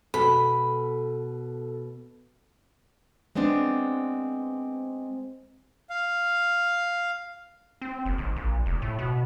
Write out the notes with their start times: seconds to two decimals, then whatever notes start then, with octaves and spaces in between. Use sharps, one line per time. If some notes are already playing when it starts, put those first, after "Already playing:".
0.14 B2 A4 B5
3.35 G#3 B3 C4 D4
5.90 F5
7.82 C4
8.06 F#1
8.18 G#1
8.36 A#1
8.66 F1
8.82 A2
8.99 B2